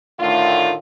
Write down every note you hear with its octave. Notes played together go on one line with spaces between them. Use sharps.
A2 D3 D#3 A3 F4